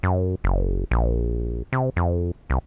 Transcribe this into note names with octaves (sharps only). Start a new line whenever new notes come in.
F#2
F#1
A#1
C3
F2
C2